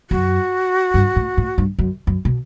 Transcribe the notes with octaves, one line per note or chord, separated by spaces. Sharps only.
F#2 F#4
G2
A2
A2
G2
F#2
F#2
B2